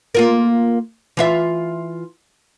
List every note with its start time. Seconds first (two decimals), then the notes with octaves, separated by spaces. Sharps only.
0.15 A#3 F4 A#4
1.17 E3 F4 E5